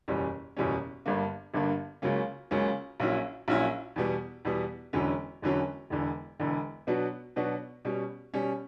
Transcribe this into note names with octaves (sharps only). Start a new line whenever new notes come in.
F#1 E2 B2 G3 C#4
F#1 E2 B2 G3 C#4
G1 G2 D3 A#3
G1 G2 D3 A#3
C#2 C#3 F#3 A#3 C#4
C#2 C#3 F#3 A#3 C#4
A#1 A#2 F#3 C#4 E4
A#1 A#2 F#3 C#4 E4
E2 B2 G3 B3
E2 B2 G3 B3
E1 E2 D3 F#3 C#4
E1 E2 D3 F#3 C#4
E1 E2 D3
E1 E2 D3
B2 F#3 B3 D4 F#4
B2 F#3 B3 D4 F#4
B2 G3 C#4
B2 G3 C#4